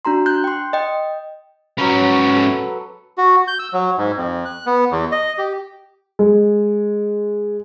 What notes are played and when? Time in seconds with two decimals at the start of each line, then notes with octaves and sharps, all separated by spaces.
0.05 D4 F#4 A#5 C6
0.26 F#6 G6
0.44 G5 C6
0.73 D#5 G5
1.78 G#2 F#3 C#4 B4
2.36 A4
3.18 F#4
3.48 G6
3.59 E6
3.73 F#3
3.98 G#2
4.17 F2
4.45 F#6
4.66 B3
4.92 E2
5.12 D#5
5.38 G4
6.19 G#3